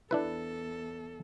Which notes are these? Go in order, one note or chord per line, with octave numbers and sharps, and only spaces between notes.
E2 D4 E4 A4 B4